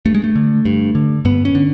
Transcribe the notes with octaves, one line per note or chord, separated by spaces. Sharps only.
G2 A3
G#3
A3
D3
G2
D3
G2 B3
C#4
D3